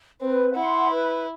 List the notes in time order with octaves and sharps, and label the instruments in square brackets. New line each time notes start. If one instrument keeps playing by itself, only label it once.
[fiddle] C4 [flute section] B4
[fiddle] E4 [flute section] F#5 C6
[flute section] B4